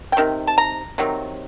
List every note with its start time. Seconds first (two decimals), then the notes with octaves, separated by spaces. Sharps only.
0.12 G5
0.17 C3 D#3
0.47 A5
0.58 A#5
0.98 C3 D#3 F#3